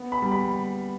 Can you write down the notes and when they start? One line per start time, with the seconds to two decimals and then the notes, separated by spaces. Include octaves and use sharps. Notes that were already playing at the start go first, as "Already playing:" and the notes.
Already playing: B3
0.12 B5
0.22 G3
0.32 B5